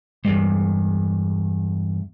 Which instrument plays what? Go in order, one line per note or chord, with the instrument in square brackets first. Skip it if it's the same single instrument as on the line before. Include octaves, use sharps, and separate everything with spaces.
[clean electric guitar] E2 G2 [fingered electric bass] G#3